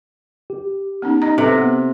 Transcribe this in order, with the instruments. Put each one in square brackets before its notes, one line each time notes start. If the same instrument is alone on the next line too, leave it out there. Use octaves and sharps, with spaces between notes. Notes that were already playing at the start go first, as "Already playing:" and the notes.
[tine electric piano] G4
[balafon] B3 C#4 D#4
D#4 D#5 A#5
[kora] C3 [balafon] A4 B4
[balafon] B3